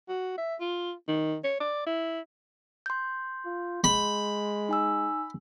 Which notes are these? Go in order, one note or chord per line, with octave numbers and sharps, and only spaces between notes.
F#4
E5
F4
D#3
C#5
D5
E4
C6 G6
F4
G#3 B5
D#4 G#5 E6